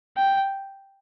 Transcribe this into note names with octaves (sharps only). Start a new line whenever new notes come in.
G5